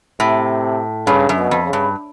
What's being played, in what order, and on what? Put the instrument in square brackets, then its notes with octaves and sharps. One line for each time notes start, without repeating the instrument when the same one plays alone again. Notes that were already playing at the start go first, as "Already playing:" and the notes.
[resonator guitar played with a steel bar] A2 [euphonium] C3
[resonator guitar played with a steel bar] G2 [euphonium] C#3
[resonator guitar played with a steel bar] F#2
[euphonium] B2
[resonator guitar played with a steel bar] F2
[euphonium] C#3
[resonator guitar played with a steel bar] G2